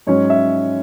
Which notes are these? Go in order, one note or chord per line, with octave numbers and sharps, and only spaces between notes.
G#2 F#3 C#4 C#5
E5